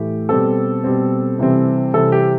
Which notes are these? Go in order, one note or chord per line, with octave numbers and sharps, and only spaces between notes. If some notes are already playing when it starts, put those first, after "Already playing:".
Already playing: A2 E3 A3 G4
B2 G3 C4 A4
B2 G3 C4
C3 E3 G3 C4
C3 E3 G3 C4 A4
G4